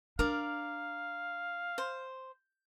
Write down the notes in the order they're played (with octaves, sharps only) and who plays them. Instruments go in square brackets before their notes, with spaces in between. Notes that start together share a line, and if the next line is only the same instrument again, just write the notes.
[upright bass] D4 [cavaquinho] A#4 D5 [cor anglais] F5
[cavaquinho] C5